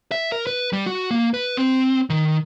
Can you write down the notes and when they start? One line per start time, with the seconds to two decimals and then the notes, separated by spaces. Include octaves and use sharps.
0.12 E5
0.32 A#4
0.47 B4
0.73 G3
0.86 F#4
1.11 A#3
1.34 B4
1.57 C4
2.10 D#3